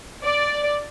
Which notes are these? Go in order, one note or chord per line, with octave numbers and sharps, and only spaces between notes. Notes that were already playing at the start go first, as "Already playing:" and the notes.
D5